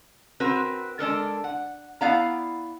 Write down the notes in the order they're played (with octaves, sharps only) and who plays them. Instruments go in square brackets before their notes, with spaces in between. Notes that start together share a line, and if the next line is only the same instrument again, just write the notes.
[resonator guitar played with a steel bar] C4 F#4 A#4 B4
G#3 D4 A4 A#4
F#5
B3 E4 D5 F5 F#5 A#5